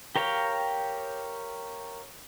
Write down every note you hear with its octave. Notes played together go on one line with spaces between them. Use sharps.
G4 A#4 C#5 F5 G5